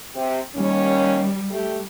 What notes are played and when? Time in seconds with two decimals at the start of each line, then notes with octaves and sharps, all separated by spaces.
0.15 C3 G4
0.55 D#2 G3 C#4
1.51 A3 G4